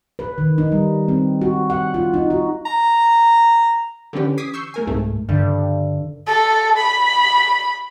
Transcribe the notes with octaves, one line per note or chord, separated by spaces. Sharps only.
B4
D#3
D#4
G3
C4
F#4
F#5
F4
D#4
F#4
A#5
D3 E3 C#4 G4 B4
D6 D#6 G#6 B6 C7
C#6 E6 G6 C7
A3 A#4 G#5
C2 G#2 A3
G2 D3
A4
B5